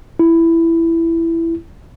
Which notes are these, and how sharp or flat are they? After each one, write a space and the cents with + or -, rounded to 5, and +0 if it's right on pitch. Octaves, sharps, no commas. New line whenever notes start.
E4 +10